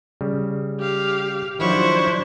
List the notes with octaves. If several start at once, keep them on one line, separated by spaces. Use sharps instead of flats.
C#3 G3
G4 F5
D#3 F3 F#3 D4 E4 C5 C#6